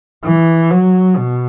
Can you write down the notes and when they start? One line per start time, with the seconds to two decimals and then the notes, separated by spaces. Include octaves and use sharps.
0.25 E3
0.70 F#3
1.17 B2